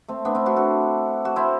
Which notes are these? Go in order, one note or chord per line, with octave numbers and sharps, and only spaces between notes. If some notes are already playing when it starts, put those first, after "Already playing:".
A3 C4
B3 D4
C4 E4
D4 F#4
F#4 A4
F#4
C4 E4